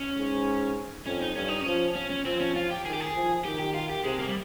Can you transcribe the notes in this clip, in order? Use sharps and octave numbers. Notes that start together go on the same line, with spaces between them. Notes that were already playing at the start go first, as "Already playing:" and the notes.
Already playing: C#4
G#2
F2 C#4
D#4
G2 C#4
D#4
F3 C#4
C#4
C#4
F3 C4
C#4
F4
G4
D#3 G#4
G4
G#4
F3
D#3 G4
G4
F4
G4
C3 G#3
A#3
G3